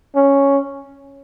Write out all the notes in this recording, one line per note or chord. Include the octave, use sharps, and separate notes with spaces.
C#4